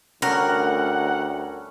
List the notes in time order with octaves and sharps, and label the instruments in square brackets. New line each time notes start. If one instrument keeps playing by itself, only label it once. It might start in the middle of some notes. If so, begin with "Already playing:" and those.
[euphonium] D2 [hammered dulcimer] G3 A3 C#4 [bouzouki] A#4 [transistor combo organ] F#5